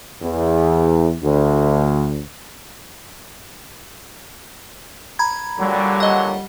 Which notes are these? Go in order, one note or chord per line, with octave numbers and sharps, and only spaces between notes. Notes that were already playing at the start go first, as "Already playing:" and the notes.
E2
D2
A#5 B5 G#6
A#2 D3 F#3 G3
D#5 F#5